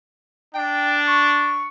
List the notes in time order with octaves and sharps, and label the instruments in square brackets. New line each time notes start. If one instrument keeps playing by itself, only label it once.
[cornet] D4 [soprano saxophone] G5
[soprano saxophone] C#6